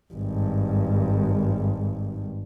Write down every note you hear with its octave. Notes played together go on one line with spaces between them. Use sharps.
G#1 G2